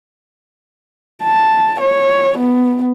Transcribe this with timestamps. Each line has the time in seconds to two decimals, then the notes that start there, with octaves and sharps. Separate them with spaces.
1.23 A5
1.80 C#5
2.38 B3